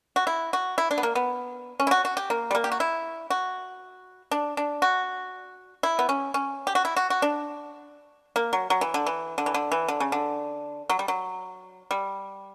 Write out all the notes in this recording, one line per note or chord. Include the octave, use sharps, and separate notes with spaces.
F#4
E4
F#4
E4
D4
B3
A#3
B3
C#4
E4
F#4
F#4
G4
A#3
G3
A#3
G4
F#4
E4
F#4
D4
D4
F#4
E4
B3
C#4
C#4
G4
F#4
E4
F#4
F#4
D4
A#3
F#3
F#3
E3
D3
E3
D3
E3
D3
E3
D3
C#3
D3
F#3
G3
F#3
G3